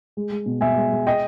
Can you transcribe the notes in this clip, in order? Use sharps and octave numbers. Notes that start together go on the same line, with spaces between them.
G#3
G#3
B2
B2 E5 G#5
G#3
G#3
D#5 G5